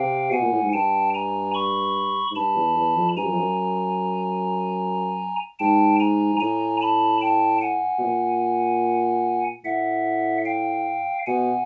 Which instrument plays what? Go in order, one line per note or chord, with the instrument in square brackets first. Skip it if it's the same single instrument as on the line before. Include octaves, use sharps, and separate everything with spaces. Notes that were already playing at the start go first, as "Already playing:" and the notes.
Already playing: [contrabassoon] C3 [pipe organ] F5 G5
[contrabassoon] B2 [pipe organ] F#5 G#5
[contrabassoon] A#2
A2
G#2
[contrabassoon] G2 [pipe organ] G5 A5
[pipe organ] G#5 A#5
B5 C#6
[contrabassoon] G#2
[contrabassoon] G2 [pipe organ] A5 B5
[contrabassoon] E2
E2
F2
[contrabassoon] G2 [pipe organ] G#5 A#5
[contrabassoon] F#2
F2
F#2
[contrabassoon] G#2 [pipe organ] G5 A5
[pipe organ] G#5 A#5
[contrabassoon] G#2
[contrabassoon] A2 [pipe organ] G#5 A#5
[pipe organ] A5 B5
G5 A5
F#5 G#5
[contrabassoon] B2
A#2
[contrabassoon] A2 [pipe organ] E5 F#5
[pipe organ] F5 G5
[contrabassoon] B2 [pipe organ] F#5 G#5